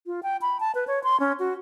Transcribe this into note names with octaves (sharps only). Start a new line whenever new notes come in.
F4
G5
B5
A5
B4
C#5
C6
C#4
F#4